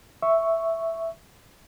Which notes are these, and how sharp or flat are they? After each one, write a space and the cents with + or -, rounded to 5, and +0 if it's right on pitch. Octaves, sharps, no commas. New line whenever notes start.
E5 +0 C#6 +0